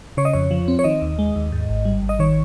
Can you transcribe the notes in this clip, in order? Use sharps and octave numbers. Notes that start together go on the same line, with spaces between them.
C#3 C#5
D#5
F2 C#5
F3
C4
C#5
D#3 D#5
D#2
G#3
D#2
G#2
G#1
G3
G#1
D#5
D#3 C#5